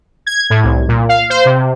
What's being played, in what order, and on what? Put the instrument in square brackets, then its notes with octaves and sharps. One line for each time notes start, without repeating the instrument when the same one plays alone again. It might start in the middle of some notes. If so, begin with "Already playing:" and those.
[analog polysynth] G#6
A2
C2
A#2
F5
C5
C3